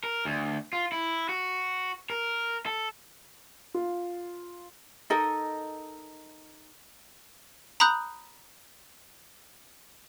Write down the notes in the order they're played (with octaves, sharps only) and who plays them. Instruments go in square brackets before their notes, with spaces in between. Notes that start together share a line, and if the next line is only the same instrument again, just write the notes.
[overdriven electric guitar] A#4
D2
F4
E4
F#4
A#4
A4
[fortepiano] F4
[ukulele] D#4 A4 A#4 D#5
[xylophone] A#5 B5 D#6 F#6 G6